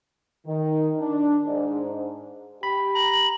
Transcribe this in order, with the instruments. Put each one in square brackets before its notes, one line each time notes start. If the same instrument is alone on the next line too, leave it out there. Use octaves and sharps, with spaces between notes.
[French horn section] D#3
D4
G#2
[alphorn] G4 [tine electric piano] B5
[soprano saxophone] A#5 [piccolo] F#7